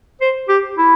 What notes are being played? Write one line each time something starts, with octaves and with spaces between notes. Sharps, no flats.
C5
G4
E4